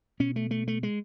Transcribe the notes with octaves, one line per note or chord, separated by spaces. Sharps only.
B2 C#4
A3
A3
A3
G#3